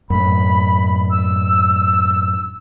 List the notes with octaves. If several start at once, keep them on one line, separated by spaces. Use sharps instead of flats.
F#2 A2 B5
E6